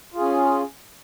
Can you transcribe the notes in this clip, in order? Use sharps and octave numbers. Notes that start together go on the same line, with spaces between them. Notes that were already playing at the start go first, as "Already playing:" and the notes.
C#4 F4 G#4